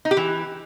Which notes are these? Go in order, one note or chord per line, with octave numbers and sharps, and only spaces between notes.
D#4
G4
E3